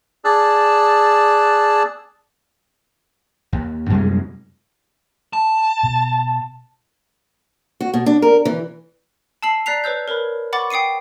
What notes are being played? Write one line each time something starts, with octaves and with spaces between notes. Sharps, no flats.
G#4 D5 A5 E6 F#6
D#2
F#2 C3 G3 G#3
A5
B2
F#4
B2
D4
A#4
E3
A5 E6 C7 F#7
D5 A#5 F#6 B6 C7 F7
B4 C#5 E6 G6
A#4 B4 C#5 B5
F#5 B5 C#6 D6 A6
G5 D#6 C7 C#7 D#7